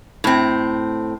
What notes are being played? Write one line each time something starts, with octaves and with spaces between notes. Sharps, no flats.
A2 C4